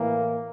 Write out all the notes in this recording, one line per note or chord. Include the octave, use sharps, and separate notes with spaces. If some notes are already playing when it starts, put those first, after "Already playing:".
Already playing: A2 E3 A#3